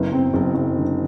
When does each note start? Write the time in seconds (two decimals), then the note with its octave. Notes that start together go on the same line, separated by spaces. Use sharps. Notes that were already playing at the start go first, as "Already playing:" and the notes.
Already playing: F#1 B3
0.12 F#1 C4
0.34 F#1
0.54 F#1
0.76 D3